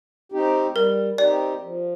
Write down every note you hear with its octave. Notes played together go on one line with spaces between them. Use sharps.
C4 D#4 G4
G3 A#4
C4 D#4 G4 D5
F3